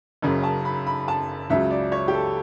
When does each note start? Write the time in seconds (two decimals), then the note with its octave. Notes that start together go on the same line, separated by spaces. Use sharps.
0.22 F#1 F#2 C#3
0.44 A5
0.65 B5
0.87 B5
1.08 A5
1.50 C#2 C#3 F#3 E5
1.71 D5
1.92 C#5
2.08 G4
2.13 A4